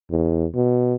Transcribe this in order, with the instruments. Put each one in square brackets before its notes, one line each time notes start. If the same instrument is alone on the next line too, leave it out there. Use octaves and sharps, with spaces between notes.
[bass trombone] E2
B2